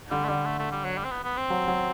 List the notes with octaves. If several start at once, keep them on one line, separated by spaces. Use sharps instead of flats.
D3 G3
A3
D3 G3
A3
A3
G3
F#3
G3
C4
B3
B3
C4
F#3
F#3